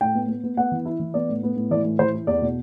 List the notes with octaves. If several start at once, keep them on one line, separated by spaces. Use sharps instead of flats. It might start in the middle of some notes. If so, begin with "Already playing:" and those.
A2 G5
B3
B3
B3
B3 F#5
E3
E4
E3
B3 D5
A2
B3
A2
E3 D5
A2
E3 C5
E4
E2 D5
B2